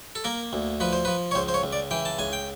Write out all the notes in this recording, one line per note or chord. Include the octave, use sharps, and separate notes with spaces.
A4
A#3 A#4
D2
F3 B4
C5
F3 B4
C#5
C#2 C5
C5
C#5
C#2
D5
E3 G5
A5
C#2 G#5
G5